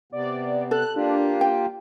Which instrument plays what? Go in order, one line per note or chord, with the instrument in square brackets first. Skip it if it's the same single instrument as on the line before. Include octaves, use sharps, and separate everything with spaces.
[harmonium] C3 B3 [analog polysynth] D5
[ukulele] A4 [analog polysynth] F#6
[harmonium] A#3 F4 G4 [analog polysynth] D4
[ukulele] G5